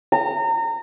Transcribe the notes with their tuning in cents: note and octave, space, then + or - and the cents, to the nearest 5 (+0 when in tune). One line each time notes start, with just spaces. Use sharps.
A#5 -30